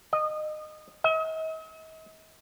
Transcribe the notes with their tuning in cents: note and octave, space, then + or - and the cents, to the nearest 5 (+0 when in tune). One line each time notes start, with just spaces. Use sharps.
D#5 -20
D#5 +45